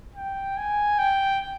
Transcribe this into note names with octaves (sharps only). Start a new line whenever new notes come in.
G5
G#5
G5